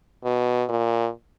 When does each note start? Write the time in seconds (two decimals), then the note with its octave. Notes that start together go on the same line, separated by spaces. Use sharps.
0.24 B2
0.69 A#2